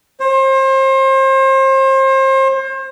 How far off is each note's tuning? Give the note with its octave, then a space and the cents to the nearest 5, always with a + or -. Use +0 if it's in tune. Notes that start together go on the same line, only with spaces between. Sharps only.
C5 +35